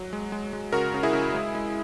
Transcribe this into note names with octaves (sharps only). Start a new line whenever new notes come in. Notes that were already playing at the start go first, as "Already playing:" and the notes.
Already playing: F#3
G#3
G#3
G#3
C#3 F#4 A#4
C#3
E4 G#4
C#3
G#3
G#3